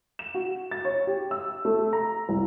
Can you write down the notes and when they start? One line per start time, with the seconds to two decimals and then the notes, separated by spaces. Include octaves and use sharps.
0.19 E7
0.34 F#4
0.71 A6
0.85 C#5
1.07 G4
1.31 E6
1.65 A3
1.93 A#5
2.29 C2